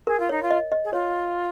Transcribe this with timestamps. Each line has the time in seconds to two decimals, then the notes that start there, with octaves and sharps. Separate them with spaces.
0.07 G#4 A#4
0.20 F4
0.29 D#4 C#5
0.43 F4
0.51 D#5
0.72 D#5
0.84 G#4
0.93 F4 C#5